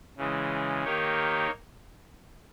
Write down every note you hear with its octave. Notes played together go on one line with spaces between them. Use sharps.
C#3 E3 G#3
D#3 A#3 D#4 G4 C#5